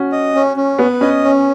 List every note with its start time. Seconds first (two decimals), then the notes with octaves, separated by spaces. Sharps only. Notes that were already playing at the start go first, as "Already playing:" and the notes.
Already playing: C#4 F#4
0.12 D#5
0.35 C#4
0.57 C#4
0.79 B3 B4
1.01 C#4 D#5
1.23 C#4